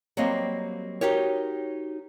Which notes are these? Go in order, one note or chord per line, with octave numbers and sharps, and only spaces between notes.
F#3 G3 A#3 C4 D#5
D#4 F#4 G4 A#4 C#5